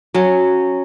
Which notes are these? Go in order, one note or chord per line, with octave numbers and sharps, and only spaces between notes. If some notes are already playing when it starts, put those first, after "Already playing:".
F#3 C#4